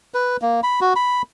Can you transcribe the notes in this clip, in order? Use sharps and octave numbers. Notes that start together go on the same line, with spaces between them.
B4
A#3
B5
F#4
B5